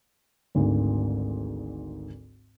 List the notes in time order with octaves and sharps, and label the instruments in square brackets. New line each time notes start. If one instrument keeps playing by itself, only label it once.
[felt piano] G#1 D2 G#2